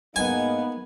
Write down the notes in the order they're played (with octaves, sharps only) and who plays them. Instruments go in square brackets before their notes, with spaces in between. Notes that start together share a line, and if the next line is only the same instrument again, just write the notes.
[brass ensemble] G#2 A#3 D#4 [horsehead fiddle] B3 [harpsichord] G#5